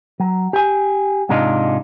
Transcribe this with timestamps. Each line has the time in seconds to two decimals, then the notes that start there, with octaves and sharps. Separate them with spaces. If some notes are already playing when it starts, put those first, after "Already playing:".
0.20 F#3
0.53 G4 G#5
1.29 G#2 C3 G#3 D4 D#4 F4